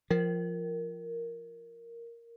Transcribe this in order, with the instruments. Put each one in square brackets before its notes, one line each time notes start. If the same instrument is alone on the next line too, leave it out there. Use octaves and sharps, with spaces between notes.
[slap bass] F3 [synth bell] A#4